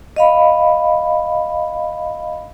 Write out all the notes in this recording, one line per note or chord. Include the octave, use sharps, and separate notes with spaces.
D#5 F5 B5